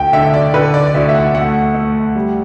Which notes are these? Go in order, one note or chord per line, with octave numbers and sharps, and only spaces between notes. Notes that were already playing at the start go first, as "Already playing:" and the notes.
Already playing: D2 G5
D3 E5
D5
D3 B4
D5
D5
D2 E5
E5
F#5
A3 F#5
A3
G3